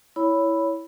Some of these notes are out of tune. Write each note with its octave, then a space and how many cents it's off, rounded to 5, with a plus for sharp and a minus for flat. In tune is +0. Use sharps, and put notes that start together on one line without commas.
E4 +0 C#5 +15 B5 +0